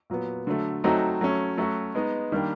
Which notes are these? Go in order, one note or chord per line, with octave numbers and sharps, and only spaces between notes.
A#2 F#3 B3
D3 F#3 A3
F#3 A3 C4 D#4 F#4
F#3 A3 C#4
F#3 A3 C#4 F#4
G#3 B3 D#4
D#3 G3 A#3 D4